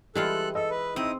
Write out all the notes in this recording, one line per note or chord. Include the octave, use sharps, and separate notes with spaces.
E3 G3 G#3 F4 A4 F#6
A4 D#5 E6
B4
C4 D#4 E4 D#6